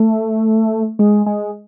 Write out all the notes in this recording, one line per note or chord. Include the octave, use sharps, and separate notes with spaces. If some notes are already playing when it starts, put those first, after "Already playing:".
Already playing: A3
G#3
G#3